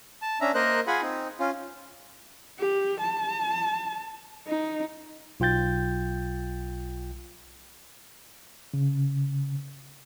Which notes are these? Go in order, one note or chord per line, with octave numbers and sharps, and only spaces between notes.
A5
C#4 D4 E5 A#5
A#3 A#4 C5 D#5 F#6
F4 G#4 F#5 G#5 B5
C4 D#4
C#4 F4
G4
A5
D#4
B1 F4 G5 G6 A6
C#3